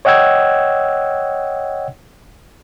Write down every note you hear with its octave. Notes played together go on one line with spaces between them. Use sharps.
C#5 D#5 F#5 G5 E6 G#6